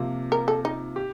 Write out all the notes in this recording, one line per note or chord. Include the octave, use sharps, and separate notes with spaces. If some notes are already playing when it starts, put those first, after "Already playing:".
Already playing: C3 F3 A#3 F4
A#4
A4
D#4
G4